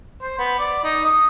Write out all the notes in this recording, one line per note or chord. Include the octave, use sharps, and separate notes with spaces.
C5
B3
D5
D#4
D#6